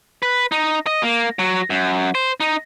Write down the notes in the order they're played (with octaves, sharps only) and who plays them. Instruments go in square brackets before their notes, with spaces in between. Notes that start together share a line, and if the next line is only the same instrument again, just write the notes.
[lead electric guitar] B4
D#4
D#5
A#3
F#3
F#2
C5
D#4